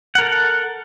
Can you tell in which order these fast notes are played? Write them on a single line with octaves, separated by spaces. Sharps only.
F#5 A#4 A4